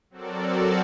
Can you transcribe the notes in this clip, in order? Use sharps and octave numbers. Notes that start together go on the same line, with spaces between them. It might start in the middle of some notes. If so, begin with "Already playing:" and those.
F#3 C4 F#4 A4 A#4 D5